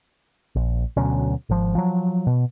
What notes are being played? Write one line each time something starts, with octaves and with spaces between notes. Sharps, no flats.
A#1
D2 B2 F#3 C#4
G#1 F3
F3 F#3
B2